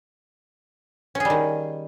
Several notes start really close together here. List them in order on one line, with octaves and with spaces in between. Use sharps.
C#4 G#4 G3 D#3